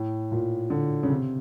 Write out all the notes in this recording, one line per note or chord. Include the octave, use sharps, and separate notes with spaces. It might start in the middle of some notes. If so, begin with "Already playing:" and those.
Already playing: A2
A#2
D3
C#3
C3